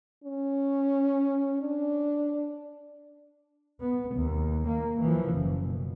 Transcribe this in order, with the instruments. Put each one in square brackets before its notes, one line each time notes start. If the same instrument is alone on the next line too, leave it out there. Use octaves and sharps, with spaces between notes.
[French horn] C#4
D4
[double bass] B3
D#2
A#3
E3 F3
F#1
B2